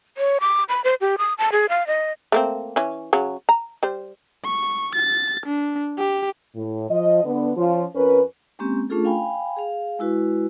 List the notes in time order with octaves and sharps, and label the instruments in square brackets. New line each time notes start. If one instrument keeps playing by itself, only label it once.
[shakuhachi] C#5
D6
B5
C5
G4
D#6
A5
G#4
F5
D#5
[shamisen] A3 A#3 C4
E3 C#4
C#3 F#3
A#5
G3 C5
[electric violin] C#6
A6
D4
G4
[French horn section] A2
F3 D#5
D3 B3
F3 C#4 F4
F2 C#4 A#4 B4
[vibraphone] G#3 A#3 C4 C#4 G4
A3 C#4 D4 F4 G#4 A4
F5 G5 G#5 B5
G#4 F5
G#3 E4 F#4 B4